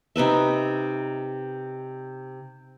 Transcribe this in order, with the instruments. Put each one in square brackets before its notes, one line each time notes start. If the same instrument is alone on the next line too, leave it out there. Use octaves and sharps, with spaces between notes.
[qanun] C3 D#4 B4 E5